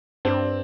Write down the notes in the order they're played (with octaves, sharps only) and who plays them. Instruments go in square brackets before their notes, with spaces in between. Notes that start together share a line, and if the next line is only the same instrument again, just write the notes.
[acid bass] G2 [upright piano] C4 D4